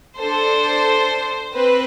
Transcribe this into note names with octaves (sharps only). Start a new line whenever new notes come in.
D4 A4 C5
C4 B4